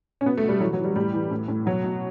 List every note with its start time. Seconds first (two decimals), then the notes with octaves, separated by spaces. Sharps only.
0.21 C#4
0.25 B2 B3
0.37 A3
0.44 B2 G3
0.60 E3 F#3
0.73 F#3
0.79 E3
0.84 G3
0.96 A2 G3
1.13 E3
1.31 A2
1.48 A2
1.66 B2 F#3
1.84 B2